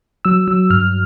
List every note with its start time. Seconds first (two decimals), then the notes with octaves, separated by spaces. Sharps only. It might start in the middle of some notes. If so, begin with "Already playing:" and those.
0.25 F#3 E6
0.48 F#3 E6
0.70 G2 F6